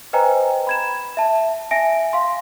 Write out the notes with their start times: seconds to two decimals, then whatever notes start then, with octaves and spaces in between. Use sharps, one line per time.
0.13 B4 C5 D#5 G5 G#5 A#5
0.67 B5 G#6 E7
1.17 E5 A5
1.71 E5 G#5 A#6 D7
2.13 F5 C6